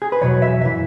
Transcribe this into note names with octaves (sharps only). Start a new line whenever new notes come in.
G#4
B4
E2 B2 F#3 C#5
E5
F#2 E3 E5